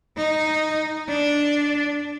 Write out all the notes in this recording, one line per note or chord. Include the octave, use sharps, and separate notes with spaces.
D#4
D4